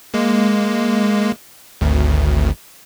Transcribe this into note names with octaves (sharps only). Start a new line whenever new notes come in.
G#3 A#3
G#1 D2